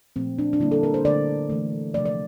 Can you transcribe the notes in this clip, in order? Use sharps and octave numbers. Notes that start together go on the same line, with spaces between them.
A#2 F3 A3 C4
D4
D4
D3 G3 A#3 E4
A4
A#4
C5
D3 A3 D5
E3 A3
C3 F3 A3 D5
D5